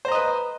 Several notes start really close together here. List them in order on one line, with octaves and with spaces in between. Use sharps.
C5 A#5 D#5 B4